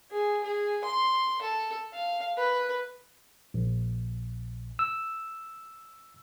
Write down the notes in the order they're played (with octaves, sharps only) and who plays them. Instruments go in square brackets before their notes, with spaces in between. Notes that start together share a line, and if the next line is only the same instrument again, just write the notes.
[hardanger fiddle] G#4
G#4
C6
A4
F5
B4
[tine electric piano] A#1
E6